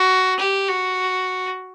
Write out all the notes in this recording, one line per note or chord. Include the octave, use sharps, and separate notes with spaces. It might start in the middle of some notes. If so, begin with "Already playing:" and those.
Already playing: F#4
G4
F#4